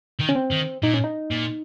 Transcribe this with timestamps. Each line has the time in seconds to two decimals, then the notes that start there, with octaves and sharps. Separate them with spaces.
0.20 D#3
0.29 C#4
0.35 C4
0.52 D#3
0.83 A#2 D#4
0.94 C#4
1.04 D#4
1.31 A#2